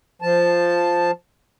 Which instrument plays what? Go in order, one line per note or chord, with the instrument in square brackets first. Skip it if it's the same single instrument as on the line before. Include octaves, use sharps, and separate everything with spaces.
[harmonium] F3 A5